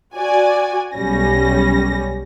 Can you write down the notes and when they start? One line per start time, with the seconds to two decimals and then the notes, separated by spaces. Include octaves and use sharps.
0.16 F#4 D5 G#5
0.94 B1 G3 C#4 A#6